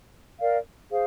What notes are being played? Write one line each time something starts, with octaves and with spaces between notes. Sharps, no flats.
A#4 D5 F5
G#4 C5 F5